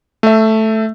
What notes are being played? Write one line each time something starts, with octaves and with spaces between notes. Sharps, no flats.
A3 E5